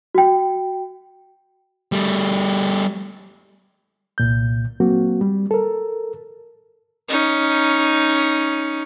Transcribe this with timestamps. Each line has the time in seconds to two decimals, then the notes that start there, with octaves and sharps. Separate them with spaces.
0.15 F#4 G5
1.92 G3 A3
4.18 C2 A#2 G6
4.80 F#3 A#3 C4 F#4
5.21 G3
5.51 A4 A#4
7.08 C#4 D#4